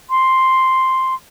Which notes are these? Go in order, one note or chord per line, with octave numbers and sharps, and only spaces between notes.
C6